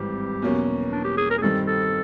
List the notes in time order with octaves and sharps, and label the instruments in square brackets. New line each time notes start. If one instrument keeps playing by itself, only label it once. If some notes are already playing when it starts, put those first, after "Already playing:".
Already playing: [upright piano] G#1 G2 E3 G3 C4 [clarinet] G4
[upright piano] E2 B2 F#3 A#3 C#4
[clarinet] D4
G4
G#4
A#4
G#4
[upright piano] G2 D#3 G3 C4 [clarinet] A4
[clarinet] A4